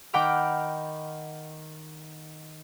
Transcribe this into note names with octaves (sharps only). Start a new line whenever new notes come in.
D#3 F#5 G5 B5 D6 F6